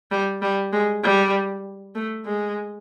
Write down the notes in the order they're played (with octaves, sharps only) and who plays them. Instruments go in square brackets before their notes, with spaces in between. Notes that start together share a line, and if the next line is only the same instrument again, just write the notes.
[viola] G3
G3
G#3
G3
A3
G#3